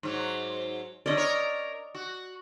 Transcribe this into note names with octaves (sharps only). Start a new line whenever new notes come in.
G#2 F#3
D3 C#4 D5 D#5
A#4 C#5
F#4